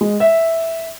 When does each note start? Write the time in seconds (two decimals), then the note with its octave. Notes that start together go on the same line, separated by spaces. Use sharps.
0.01 G#3
0.20 E5